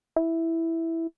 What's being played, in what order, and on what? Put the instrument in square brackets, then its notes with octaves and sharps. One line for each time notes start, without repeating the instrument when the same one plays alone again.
[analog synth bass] E4